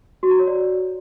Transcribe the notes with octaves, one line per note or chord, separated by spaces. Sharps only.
F#4
A#5
C#5
D5